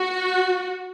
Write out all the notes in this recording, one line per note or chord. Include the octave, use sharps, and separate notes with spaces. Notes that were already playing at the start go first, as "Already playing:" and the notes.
Already playing: F#4